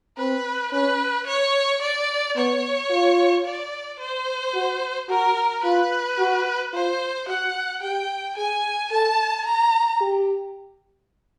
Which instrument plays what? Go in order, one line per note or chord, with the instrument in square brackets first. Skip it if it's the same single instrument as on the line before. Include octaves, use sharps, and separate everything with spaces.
[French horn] C4 [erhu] B4
[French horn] C#4 [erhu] B4
[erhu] C#5
D5
[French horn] B3 [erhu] C#5
[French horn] F4
[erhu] D5
C5
[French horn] F#4
[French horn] F#4 [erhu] A#4
[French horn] F4 [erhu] B4
[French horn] F#4
[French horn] F4 [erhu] C5
[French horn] F#4 [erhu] F#5
[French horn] G4 [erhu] G5
[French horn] G#4 [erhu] G#5
[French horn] A4 [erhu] A5
[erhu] A#5
[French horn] G4